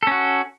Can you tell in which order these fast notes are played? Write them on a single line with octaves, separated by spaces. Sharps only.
A4 C#4 F#4